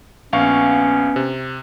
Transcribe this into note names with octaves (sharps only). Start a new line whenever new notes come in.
A#1 B3 C#4 F5 C#6
C3